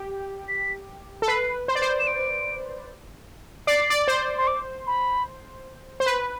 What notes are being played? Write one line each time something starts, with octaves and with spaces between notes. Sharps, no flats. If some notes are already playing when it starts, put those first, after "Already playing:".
Already playing: G4
B6
A4
B4 C7
C5
D5
C5
E7
D7
D5 C7
D5
C5
C6
D6
B5
C5
B4